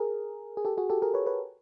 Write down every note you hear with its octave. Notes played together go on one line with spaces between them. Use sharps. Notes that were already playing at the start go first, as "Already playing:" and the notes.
Already playing: G#4 A#4
G#4
G4 A4
F#4 G#4
G4 A4
G#4 A#4
B4 C#5
B4 C#5